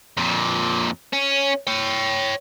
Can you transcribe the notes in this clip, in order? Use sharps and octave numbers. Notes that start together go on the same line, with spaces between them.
F2 A#2
C#4
C#5 G5